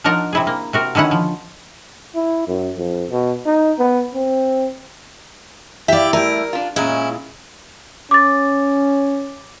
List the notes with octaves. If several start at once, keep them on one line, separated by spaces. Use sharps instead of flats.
F3 D4 D#4 A#4 F#5 A#5
C3 E4 G#4
A#3
C3 F#4 A#4
D3 D#3 C#4 E4 F#5
F3
E4
F#2
F2
B2
D#4
B3
C4
E4 G4 D5 E5 F5
G3 A3 A#4
D4 F4
A#2 G#3 C#4 E4
C#4 D6 A6